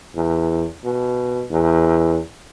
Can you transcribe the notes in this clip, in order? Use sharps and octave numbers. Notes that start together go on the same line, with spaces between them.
E2
B2
E2